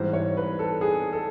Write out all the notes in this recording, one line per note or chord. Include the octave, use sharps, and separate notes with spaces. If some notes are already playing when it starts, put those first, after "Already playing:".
Already playing: G#2 E3 G3 C5
C#5
B4
A4
G#4
A4